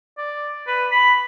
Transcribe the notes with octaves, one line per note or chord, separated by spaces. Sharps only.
D5
B4
B5